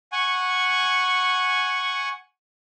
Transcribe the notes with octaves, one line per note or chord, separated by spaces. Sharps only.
F#5 G#5 C#6